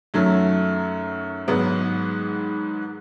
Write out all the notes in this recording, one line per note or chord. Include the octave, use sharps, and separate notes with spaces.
F#2 D#3 F#3 A3
G#2 D#3 F#3 B3